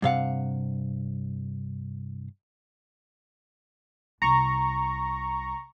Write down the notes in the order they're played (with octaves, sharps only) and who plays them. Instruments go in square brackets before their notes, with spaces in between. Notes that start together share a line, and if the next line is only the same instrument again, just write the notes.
[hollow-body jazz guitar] G2 C3 F5 F#5
[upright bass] C2 [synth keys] A#5 C#6